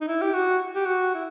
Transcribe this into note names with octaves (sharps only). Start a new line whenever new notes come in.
D#4
E4
G4
F#4
G4
F#4
E4